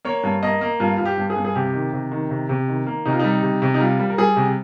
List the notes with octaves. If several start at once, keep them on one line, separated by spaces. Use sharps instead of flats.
A#3 C#5
G2
A#3 D#5
A#3
G2 F4
G2 F4
G4
G2
G#4
G2
G#4
C3 G4
D#3
C3
D#3
C3
C3
D#3
A#3
C3 D#4
F4
G3 D#4
C3
C3
D#4
G3 F4
G3
A#4
G3 G#4
C3